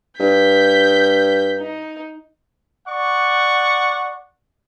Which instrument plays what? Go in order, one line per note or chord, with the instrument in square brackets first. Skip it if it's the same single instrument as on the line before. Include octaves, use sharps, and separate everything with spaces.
[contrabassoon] G2 [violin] G6 B6
[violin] D#4
[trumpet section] D5 F#5 C#6